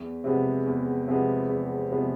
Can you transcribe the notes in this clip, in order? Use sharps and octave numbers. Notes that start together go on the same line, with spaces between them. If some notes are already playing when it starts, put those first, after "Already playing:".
Already playing: E2
C3 F3 G#3 B3
E2
C3 F3 G#3 B3
E2
C3 F3 G#3 B3